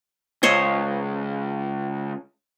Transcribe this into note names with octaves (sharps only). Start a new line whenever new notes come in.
C#2 C5 C#5 D#5